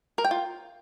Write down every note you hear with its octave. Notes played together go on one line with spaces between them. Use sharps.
A#4
G5
F4